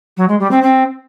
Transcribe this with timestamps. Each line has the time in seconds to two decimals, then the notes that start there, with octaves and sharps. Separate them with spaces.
0.17 F#3
0.28 G#3
0.40 G3
0.51 C4
0.62 C4